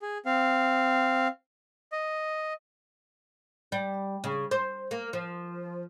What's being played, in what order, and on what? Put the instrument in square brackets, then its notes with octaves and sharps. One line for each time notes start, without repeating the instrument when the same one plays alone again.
[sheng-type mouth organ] G#4
C4 F5
D#5
[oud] G3
C#3
C5
A#3
F3